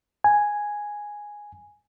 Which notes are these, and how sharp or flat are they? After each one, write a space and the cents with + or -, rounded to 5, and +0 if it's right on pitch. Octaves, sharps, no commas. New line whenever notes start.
G#5 +0